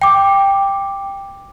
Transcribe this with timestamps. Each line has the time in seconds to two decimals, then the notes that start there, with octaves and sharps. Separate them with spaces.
0.02 G5 D6